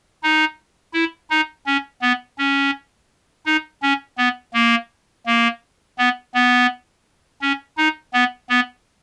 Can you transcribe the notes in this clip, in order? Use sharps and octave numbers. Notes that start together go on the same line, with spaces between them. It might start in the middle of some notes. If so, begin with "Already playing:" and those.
D#4
E4
D#4
C#4
B3
C#4
D#4
C#4
B3
A#3
A#3
B3
B3
C#4
D#4
B3
B3